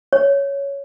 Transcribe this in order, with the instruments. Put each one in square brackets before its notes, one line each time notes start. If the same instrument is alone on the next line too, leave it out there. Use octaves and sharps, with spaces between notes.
[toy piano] C#5